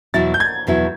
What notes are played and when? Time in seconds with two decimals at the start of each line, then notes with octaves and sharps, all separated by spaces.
0.14 E2 B2 F#3 B3 E4 A6
0.34 G6
0.40 G#6
0.67 E2 B2 F#3 B3 E4